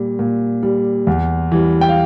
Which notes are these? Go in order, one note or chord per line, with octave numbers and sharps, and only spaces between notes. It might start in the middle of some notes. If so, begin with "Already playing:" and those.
Already playing: A#2 G3
A#2
G3
E2
E3 G3
G5
F5